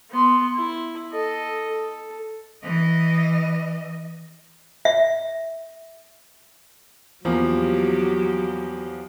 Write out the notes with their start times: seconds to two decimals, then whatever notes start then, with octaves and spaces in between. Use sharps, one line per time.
0.10 B3 C6
0.55 E4
1.12 A4 D#5
1.69 A4
2.63 E3 D#5
4.85 E5
7.25 E2 F3 F#3 A#3 G4